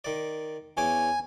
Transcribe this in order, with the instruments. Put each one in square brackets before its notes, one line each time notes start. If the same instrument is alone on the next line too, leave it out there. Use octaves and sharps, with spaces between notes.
[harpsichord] D#3 D5
[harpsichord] E2 C#4 D6 [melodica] G#5